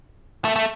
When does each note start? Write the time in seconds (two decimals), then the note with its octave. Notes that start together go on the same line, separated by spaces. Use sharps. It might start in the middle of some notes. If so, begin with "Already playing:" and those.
0.45 A3
0.56 A3